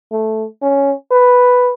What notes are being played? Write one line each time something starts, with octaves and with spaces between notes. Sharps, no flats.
A3
C#4
B4